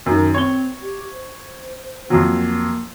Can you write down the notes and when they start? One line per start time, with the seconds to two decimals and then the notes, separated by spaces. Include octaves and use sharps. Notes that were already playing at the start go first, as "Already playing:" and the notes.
0.06 F#2 D#3
0.34 C4 C#5 G7
0.82 G4
1.11 C5
2.10 F2 F#3 A#3